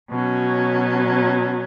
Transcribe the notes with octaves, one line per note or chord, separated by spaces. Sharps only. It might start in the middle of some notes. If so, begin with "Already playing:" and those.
B2 F#3 C#4